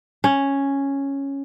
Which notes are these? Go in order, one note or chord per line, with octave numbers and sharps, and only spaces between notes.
C#4